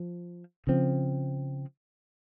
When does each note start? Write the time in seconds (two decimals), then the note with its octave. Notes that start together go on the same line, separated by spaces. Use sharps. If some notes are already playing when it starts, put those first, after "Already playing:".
Already playing: F3
0.67 C#3 F3 C4